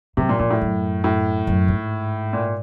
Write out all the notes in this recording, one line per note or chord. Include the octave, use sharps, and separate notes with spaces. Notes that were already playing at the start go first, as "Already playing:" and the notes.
F#2 C3
A#2
F2 A#2
A2
F#2
A2
F#2
G#2
A#2